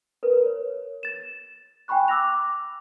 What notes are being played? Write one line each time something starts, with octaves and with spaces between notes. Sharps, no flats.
A#4 B4
C#5
A6 E7
G5 G#5 B5 C#6 F#6
D6 E6 F#6 A#6 F7